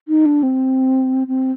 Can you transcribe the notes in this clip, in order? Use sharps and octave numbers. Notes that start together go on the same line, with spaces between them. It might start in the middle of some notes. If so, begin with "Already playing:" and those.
D#4
D4
C4
C4